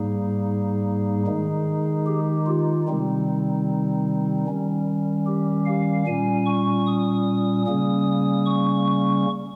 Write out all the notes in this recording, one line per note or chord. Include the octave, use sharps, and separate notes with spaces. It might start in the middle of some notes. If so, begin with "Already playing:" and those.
Already playing: G#2 G3 A#3 D#4 G#4
D#3 G#3 D#4
G4
F4
C3 D#3 G3 C4 D#4
D#3 G3 C#4
G4
F5
A#2 G3 C#4 G#5
C#6
D#6
C#3 G3 A#3 C#4 D#6
C#6